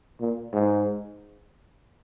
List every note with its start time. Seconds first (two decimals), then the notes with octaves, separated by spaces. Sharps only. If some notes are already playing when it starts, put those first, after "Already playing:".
0.20 A#2
0.53 G#2